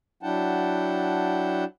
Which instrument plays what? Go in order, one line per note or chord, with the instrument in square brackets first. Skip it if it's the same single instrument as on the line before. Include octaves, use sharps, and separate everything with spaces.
[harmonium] F#3 D4 E4 F#5 G5 A5